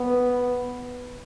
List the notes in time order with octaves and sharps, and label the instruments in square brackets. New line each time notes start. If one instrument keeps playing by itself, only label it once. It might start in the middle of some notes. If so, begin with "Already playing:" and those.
Already playing: [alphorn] B3